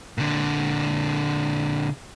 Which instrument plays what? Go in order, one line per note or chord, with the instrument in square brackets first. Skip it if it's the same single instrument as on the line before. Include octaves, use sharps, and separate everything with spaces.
[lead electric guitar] A#2 D3